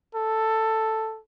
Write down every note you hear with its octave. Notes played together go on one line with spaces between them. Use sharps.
A4